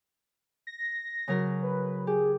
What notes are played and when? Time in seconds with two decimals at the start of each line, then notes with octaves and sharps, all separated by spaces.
0.67 A#6
1.28 C#3 F#3 A#4
1.63 B4
2.07 G4 G#4